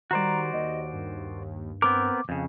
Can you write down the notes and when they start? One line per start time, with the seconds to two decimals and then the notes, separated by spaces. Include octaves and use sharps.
0.11 D#3 G3 F#4 C5 D5 A#5
0.53 D#2 D#5
0.93 G2
1.82 B3 C4 A#4 D6
2.29 F2 C#3